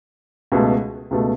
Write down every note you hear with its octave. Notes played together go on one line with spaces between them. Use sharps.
C#2 B2 A3
C#2 B2 A3